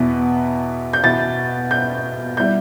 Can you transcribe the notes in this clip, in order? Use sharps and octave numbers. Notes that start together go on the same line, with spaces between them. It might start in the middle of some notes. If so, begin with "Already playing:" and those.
Already playing: E2 B2 B3 E4
G6
B2 B3 E4 A6
G6
G3 E4 G6